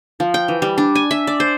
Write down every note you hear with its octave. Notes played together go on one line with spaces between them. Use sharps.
F3
G5
E3
G3
D4
G#5
E5
D5
C5